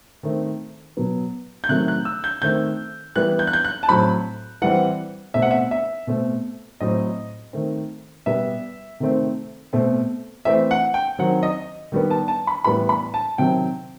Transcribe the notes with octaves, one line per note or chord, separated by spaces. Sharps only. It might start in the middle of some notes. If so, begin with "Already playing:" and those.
D#3 A3 C4
B2 F#3 B3
G6
C3 D#3 F#3 A3 F#6
F#6
E6
G6
D#3 A3 C4 G6
E3 G3 B3 F#6
G6
F#6
G6
F#6
A5
A2 F#3 C4 B5
E3 G3 C4 F#5
B2 A3 C4 E5
F#5
E5
E5
B2 A3 C4
A2 F#3 A3 C4 D#5
D#3 A3 C4
B2 G3 B3 E5
C3 D#3 A3 C4
B2 A3 C4
E3 A3 C4 E5
F#5
G5
D#3 F#3 C4 F#5
D#5
D#3 G3 B3
A5
A5
B5
A2 E3 G3 B3 B5
B5
A5
C3 D#3 F#3 C4 G5